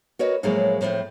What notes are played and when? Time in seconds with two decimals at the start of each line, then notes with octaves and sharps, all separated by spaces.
0.19 F#4 A#4 B4 C#5 D#5
0.43 A2 F3 F#3 G#3 A#3 G#4
0.81 A2 F3 C4